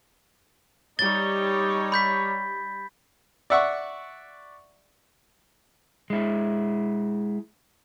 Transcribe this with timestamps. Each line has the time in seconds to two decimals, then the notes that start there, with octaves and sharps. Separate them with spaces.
0.99 G3 D#4 C#5 A6 G7
1.92 B5 G6 B6
3.50 D5 E5 F#5 C#6
6.10 G#3 E4